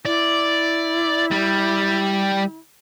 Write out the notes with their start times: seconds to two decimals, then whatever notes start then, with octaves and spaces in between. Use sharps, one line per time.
0.05 E4 D5
1.31 G3